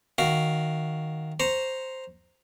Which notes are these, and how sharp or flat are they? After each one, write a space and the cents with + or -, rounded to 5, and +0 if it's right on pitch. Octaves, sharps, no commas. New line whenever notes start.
D#3 +0 F#4 +0 F5 +0
C5 +0 A#5 +0 C#6 +0